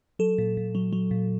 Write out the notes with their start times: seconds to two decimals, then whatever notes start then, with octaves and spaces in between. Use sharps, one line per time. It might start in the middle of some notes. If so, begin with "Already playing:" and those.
0.19 F#3 A4
0.38 A#2
0.57 A#2
0.75 F#3
0.93 F#3
1.11 A#2